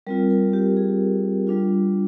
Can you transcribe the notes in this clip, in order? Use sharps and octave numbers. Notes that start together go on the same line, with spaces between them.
G3 C4 F4 A#4
A#4
G4
G#4
G3 D4 F4